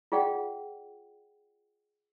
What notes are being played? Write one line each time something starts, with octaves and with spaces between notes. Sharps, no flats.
F4 G#4 D5 F#5 G5